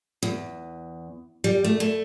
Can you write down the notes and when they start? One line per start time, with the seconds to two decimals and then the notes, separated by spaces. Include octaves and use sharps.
0.23 E2
1.44 G3
1.64 A3
1.80 A3